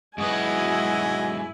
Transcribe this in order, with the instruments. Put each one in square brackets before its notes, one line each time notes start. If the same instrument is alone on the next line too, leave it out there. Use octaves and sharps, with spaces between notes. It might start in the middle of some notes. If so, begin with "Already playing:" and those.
[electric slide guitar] G#2 F#3 B4 [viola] E4 G#5 [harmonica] F#4 G#4 D#5